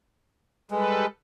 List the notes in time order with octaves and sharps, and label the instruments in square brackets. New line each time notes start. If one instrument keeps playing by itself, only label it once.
[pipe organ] G3 A4 B4 [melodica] G#3